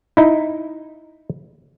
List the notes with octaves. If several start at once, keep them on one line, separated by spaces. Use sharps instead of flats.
D#4 E4